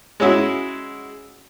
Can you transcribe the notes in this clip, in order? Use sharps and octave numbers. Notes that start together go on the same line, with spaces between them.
G#3 C#4 E4 F#4